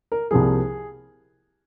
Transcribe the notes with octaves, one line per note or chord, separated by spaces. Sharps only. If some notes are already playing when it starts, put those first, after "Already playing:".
A#4
C2 C3 F3 A#3 G#4